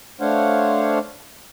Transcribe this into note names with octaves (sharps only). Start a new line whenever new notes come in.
A3 D4 C5 C#5 F5 F#5